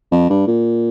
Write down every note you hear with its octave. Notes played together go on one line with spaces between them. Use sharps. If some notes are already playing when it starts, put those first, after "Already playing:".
F2
G2
A#2